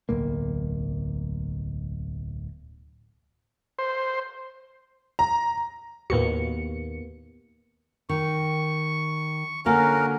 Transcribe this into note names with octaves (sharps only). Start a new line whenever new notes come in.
D1 B1 A#3
C5
A#5
D#2 A2 A#3 B3 F#4 C#7
D#3 C#6
D3 A#3 C#4 F#4 A#4 F5